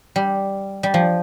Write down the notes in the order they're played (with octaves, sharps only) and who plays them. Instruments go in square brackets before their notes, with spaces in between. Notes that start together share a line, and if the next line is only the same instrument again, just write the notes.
[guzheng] G3
G3
F3